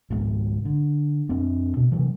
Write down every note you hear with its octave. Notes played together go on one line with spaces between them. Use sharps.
G#1 C#2 G#2
D3
F2 C4 D4
B2
C3 E3 F#3